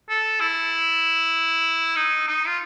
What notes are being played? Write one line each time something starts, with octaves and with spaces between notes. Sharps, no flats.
A4
E4
D#4
D#4
F4